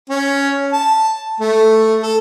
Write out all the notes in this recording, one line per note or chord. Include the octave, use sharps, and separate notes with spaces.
C#4
A5
A3
A4